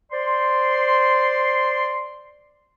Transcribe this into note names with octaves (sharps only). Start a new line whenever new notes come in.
C5 D5 C6